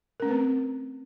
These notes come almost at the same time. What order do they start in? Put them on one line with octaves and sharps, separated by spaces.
A#4 C#4 A3 B4 C4